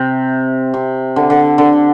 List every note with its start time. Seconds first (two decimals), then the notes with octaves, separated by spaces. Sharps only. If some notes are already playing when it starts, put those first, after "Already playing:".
Already playing: C3
0.74 C3
1.16 D3
1.30 D3
1.58 D3